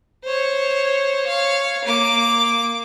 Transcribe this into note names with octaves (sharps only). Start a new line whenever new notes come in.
C5 C#5
C#5 F5
A#3 D6